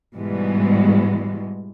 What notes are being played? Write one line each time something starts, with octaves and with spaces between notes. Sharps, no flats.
G#2 B2 E3 G3 G#3